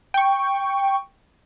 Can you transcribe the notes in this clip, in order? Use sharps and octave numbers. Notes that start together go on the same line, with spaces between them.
G5 C#6